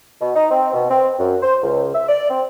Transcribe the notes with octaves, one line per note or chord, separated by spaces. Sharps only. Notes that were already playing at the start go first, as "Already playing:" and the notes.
B2
D#4
C4
B2
C4
F#2
C5
C#2
E5
D5
C4